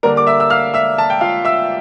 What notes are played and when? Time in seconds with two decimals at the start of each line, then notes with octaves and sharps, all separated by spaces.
0.03 D3 G3 A#3 D4 A#4 A#5
0.17 D6
0.27 E5 E6
0.40 E6
0.50 F5 F6
0.74 E5 E6
0.98 A5
1.10 G5
1.21 F4 F5
1.44 E5 E6